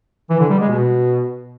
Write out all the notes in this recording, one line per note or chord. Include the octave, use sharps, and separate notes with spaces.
E3
D3
G3
G#3
B2